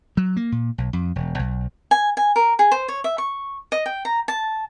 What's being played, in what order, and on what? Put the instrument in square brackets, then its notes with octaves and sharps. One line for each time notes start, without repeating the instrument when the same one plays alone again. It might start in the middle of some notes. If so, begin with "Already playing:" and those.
[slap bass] F#3
A#3
A#2
B1
F2
E1
B1
[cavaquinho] G#5
G#5
A#4
G#4
C5
C#5
E5
C#6
D#5
G5
A#5
A5